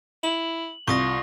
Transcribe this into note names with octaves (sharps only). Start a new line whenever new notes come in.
E4 F#7
C2 F4 C#6 D#6 A#6